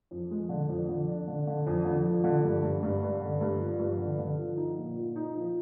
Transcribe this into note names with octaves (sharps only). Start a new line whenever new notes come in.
F2
G#3
D3
F2
D3
D4
D3
D3
F2
D3
F3
D3
G2
G2
G2
G2
D3
G2
F3
G2
D3
D3
F3
D#4
A#2
A#2
D#4
F3